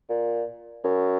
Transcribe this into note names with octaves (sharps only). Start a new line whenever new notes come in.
A#2
F#2